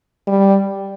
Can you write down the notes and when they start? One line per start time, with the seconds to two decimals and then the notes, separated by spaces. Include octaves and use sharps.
0.27 G3